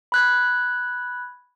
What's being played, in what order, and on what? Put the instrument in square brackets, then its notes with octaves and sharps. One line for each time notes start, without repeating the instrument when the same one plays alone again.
[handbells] B5 F#6 G#6